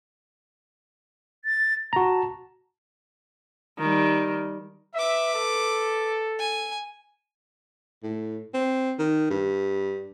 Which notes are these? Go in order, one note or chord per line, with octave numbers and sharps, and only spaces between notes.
A6
F#4 A5 A#5
D#3 G3
B4 E5 D6
A4
G#5
A2
C4
D#3
G2